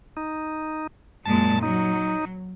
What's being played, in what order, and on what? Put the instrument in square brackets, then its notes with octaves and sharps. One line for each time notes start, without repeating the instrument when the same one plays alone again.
[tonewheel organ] D#4
[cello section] F#2 A#2 G#3 [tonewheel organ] A5
[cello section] F#3 [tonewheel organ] D#4